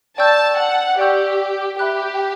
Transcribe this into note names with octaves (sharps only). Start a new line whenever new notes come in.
D5 G5 A5 C#6 E6 G6
F#5
G4 D5 G5 C#6 E6 G6
G4 E5 B5 F#6